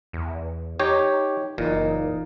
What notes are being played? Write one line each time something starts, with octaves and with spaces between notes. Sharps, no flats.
E2
D#4 G4 C#5 G5
F#1 A#2 E3 A#3 D#4